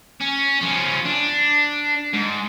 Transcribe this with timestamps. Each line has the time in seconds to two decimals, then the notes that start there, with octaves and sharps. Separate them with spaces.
0.21 C#4
0.61 F3 C#4
1.06 D4
2.13 G#2